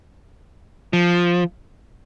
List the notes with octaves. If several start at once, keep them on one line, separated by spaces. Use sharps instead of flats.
F3